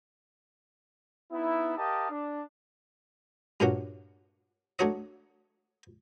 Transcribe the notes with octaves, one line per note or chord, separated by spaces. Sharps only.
B3 D#4 E4
G4 A#4 D#5 F5 A5
D4
G2 A#2 A#3 C#4 D4 F#4
A3 D4 D#4 F#4 C#5 D#5